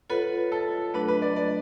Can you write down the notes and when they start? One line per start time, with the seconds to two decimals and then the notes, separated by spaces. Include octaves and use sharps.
0.10 F4 A4 B4 C#5 F#5
0.52 A4
0.94 F#3 A3 D4 B4
1.08 B4
1.22 D5
1.36 D5